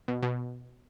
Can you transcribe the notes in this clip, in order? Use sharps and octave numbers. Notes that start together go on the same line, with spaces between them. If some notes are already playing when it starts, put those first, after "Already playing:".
B2
B2